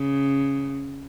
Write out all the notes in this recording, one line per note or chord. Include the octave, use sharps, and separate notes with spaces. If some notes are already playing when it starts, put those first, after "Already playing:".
Already playing: C#3